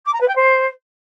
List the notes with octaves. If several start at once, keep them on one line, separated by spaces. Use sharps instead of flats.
D6
A#5
B4
G5
C5